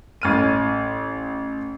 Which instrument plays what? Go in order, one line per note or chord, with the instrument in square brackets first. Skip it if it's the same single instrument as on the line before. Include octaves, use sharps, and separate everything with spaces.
[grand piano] A1 F6 D#7